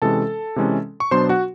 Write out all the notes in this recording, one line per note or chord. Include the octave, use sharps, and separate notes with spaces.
C3 E3 G#3 C#4 A4 A5
C3 E3 G#3 C#4
C#6
B2 F#3 B3 D4 C5 C6
F#4 F#5